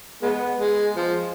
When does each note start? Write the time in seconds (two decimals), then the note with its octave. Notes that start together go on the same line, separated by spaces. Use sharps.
0.23 G#3 B3
0.60 G#3
0.97 F3